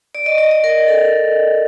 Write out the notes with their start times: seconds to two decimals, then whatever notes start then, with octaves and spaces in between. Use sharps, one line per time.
0.15 D5
0.26 D#5
0.38 D#5
0.51 D5
0.64 A#4
0.88 A4